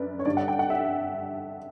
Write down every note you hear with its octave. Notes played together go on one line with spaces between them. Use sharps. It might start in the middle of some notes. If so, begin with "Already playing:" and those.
Already playing: F#2 D3 B4 D5
C#5
G2 D3 G3 D5
F#5
G5
F#5
E5